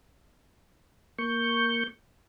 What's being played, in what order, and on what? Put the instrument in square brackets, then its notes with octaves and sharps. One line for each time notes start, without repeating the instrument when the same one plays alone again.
[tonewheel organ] A#3 C#6 G6